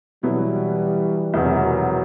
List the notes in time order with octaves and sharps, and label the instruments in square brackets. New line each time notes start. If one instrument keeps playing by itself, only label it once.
[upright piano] B2 F#3 B3 E4 [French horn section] E3 G3
[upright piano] E1 E2 C3 [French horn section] D#3 F#3